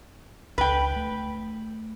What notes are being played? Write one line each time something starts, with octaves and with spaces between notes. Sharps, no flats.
C#2 F3 D4 B4 G5
A3